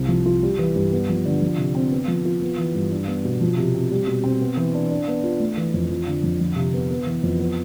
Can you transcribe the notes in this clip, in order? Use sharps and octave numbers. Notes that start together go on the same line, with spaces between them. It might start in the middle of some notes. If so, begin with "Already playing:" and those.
Already playing: C2 C4
F3
F4
G3
E3
G2
B3
F3
D3
F3
C3
C4
B3
F3
F4
B3
E3
G2
D4
B3
B2
F3
C3
C4
G3
B2
C4
B3
E3
D4
D4
B3
F4
A3
E3
F2
F3
D3
F2
F3
C3
B3
B3
E3
F2
B3